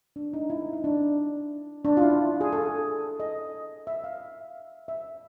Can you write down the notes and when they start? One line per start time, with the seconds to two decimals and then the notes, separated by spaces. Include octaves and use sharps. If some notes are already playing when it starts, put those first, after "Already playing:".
0.16 D4
0.34 D#4
0.50 E4
0.73 D#4
0.84 D4
1.85 D4
1.97 F4
2.02 E4
2.41 G#4
2.53 A4
3.20 D#5
3.87 E5
4.04 F5
4.88 E5